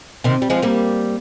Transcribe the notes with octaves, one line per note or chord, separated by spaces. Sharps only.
C3 D#3
G3
F3 G#3
G3 A#3